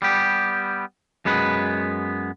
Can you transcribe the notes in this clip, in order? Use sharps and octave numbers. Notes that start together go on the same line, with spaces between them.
G3 B3 G4
F#2 G#3 B3 B4